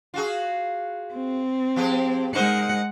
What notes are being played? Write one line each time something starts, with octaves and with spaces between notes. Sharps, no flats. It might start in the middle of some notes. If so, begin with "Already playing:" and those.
F4 F#4 G#4
C4
F3 G4 G#4
G#3 D#4 A#4 C5 F#5